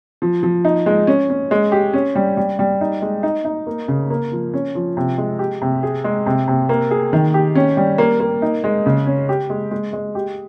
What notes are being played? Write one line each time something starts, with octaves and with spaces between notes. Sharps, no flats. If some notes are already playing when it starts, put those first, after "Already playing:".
F3
F3
D#4
G#3
C#4
C#4
G#3
G4
C#4
G3
G3
G3
D#4
G#3
D#4
D#4
A#3
C#3
A#3
F3
C#4
F3
C3
G#3
G4
C3
G#4
G#3
C3
C3
A#3
G#4
D#3
G4
C#4
G3
A#3
A#3
D#4
G#3
C#3
C#4
G4
G#3
G#3
G#3
G4